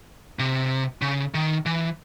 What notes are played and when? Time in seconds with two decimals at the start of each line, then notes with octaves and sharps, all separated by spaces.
0.39 C3
1.02 C#3
1.34 D#3
1.66 E3